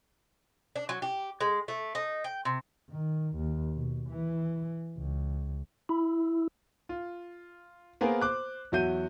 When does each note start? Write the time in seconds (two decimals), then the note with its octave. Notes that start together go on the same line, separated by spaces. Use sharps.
0.76 D4
0.89 F#3
1.02 G4
1.41 G#3
1.68 A3
1.95 D#4
2.24 G5
2.45 C3
2.90 D#3
3.36 D#2
3.76 B2
4.09 E3
4.97 C#2
5.89 E4
6.89 F4
8.01 A#3 B3 G#4 A#4 C5
8.22 C5 D6 F#6
8.72 E2 F#3 F#4 E5 G6 D#7